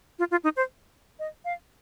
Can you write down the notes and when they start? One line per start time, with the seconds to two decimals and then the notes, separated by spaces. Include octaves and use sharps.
0.19 F4
0.31 F4
0.44 D#4
0.57 C5
1.19 D#5
1.45 F5